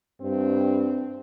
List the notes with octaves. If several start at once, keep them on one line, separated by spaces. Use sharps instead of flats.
G2 C4